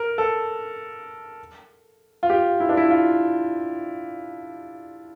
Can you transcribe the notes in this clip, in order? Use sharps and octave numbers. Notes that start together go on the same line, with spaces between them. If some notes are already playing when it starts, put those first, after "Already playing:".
Already playing: A#4
A4
F4
G4
E4
D4
E4
F4